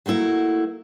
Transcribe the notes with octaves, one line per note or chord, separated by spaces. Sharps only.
F#3 A3 A#3 E4 F#4